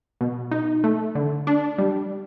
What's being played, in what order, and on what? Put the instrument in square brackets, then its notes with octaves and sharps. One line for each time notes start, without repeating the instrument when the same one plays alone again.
[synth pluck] B2
D#4
A3
D3
D4
G3